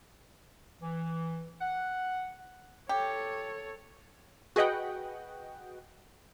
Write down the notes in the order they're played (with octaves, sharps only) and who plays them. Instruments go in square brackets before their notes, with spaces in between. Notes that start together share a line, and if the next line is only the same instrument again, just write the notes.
[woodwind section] E3
F#5
[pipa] G4 [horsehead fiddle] A4 C#5
[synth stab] F#4 G#4 B4 D#5 F#5 G5